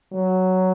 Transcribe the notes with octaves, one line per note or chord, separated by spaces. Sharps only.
F#3